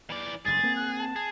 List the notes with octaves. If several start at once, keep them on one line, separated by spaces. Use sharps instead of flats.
E3 D5
F#1 G2 G#4 A6
A#3 C4
F#6
A5
G#4